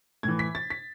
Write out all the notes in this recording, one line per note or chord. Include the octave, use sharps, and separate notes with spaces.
A2 E3 G#6
B6
A6
B6